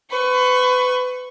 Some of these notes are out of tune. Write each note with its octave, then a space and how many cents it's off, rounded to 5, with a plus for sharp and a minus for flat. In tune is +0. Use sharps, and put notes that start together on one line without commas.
B4 +30 C#6 -10